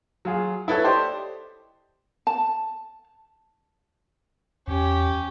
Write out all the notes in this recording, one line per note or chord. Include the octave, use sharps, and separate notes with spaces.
F#3 F4 G#4
E4 A4 B4 C#5
G4 C5 D5 D#5
A5
E2 C#4 G4